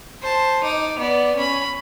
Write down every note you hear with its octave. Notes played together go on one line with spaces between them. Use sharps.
C5 A5
D#4 D6
B3 D5
C#4 B5